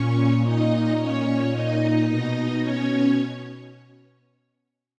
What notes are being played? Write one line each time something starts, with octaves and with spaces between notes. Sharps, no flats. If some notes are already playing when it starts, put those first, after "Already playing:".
Already playing: A#2 C#4 C#5
D#4 D#5
A#2 C#4 C#5
D#4 D#5
B2 D#4 D#5
C#4 C#5